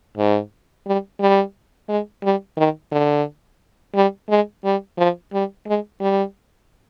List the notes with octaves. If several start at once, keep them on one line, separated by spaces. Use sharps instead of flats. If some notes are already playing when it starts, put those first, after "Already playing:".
G#2
G3
G3
G#3
G3
D#3
D3
G3
G#3
G3
F3
G3
G#3
G3